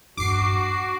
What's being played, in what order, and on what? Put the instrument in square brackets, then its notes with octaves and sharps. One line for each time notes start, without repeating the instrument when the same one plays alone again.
[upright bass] G2 D4 [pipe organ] F#4 [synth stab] D6 C7